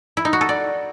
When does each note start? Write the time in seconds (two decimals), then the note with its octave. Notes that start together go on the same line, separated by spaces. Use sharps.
0.17 E4
0.25 D#4
0.33 F#4
0.41 A4
0.49 D5